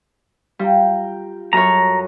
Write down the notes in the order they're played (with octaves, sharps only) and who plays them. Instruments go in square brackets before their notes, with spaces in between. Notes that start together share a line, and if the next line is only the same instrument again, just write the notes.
[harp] G3 [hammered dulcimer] F4 G5 A#5
[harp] F#2 C#5 [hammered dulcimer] A4 [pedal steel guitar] A#5